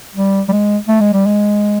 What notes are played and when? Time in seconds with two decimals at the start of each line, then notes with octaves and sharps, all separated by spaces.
0.16 G3
0.48 G3
0.52 G#3
0.88 A3
1.00 G#3
1.13 G3
1.26 G#3